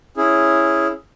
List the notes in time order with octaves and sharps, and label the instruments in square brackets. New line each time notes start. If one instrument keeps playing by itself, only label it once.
[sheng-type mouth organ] C#4 E4 G#4